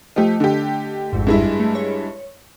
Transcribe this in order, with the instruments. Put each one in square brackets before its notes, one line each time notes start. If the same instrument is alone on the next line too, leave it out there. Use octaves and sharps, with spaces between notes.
[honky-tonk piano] F3 G4 [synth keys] A3 D#5
[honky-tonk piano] D3 G4
[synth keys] G#1 F2 G#2
[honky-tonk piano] G2 G#3 E4
[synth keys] A3
C#5